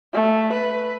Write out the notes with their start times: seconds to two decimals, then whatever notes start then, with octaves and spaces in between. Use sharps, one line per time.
0.14 A3
0.53 B4